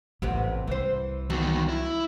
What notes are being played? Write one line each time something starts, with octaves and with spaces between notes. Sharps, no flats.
A1 E2 G#2 C3 B3
C2 E3 C5
E2 D#3 F#3
E4